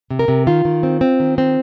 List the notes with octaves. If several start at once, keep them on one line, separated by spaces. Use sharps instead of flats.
C3
A#4
C3
D#3 F4
D#3
C4
C4
D#3
C4